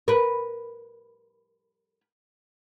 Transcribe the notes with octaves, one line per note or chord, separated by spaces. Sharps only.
A#4 B4